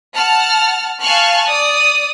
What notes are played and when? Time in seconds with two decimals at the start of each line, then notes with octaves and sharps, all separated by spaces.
0.14 F#5 A5 F6
1.02 F5 G#5 A5 C#6 F6 F#6
1.49 D5 D#6